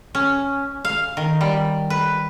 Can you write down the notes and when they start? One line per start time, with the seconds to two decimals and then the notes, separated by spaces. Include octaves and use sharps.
0.15 C#4
0.85 F5
1.17 D#3
1.41 G3
1.90 B4